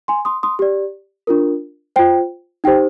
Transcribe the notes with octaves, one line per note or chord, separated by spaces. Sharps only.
G#5 C6
C6 D#6
C6 D#6
G4 D5
D4 F4 A#4
F4 C5 G5
D#4 G4 C5 G5